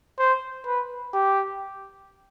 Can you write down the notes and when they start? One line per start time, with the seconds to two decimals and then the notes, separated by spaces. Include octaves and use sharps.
0.19 C5
0.66 B4
1.13 G4